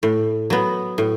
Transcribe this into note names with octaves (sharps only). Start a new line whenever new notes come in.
A2
F#3 B3
A2